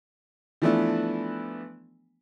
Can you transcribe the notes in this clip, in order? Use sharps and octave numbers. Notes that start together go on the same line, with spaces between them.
E3 F3 A3 B3 D4 E4